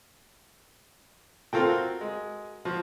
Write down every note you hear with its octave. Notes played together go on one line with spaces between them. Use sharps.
C4 F4 F#4 A4 A#4 G5
G#3
F3 F#4